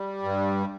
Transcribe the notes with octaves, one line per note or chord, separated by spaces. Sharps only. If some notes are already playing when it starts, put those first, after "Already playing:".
Already playing: G3
G2